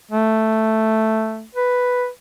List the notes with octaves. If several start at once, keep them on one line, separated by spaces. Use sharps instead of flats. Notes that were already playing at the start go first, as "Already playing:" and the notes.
A3
B4